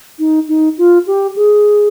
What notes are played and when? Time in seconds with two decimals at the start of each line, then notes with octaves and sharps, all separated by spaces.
0.19 D#4
0.48 D#4
0.78 F4
1.07 G4
1.36 G#4